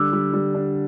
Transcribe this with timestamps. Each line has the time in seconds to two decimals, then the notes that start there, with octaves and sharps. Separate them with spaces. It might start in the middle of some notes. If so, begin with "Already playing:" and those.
Already playing: D3 G3
0.13 G3
0.33 G3
0.54 D4